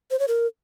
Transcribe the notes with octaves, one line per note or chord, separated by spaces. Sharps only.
C5
C#5
A#4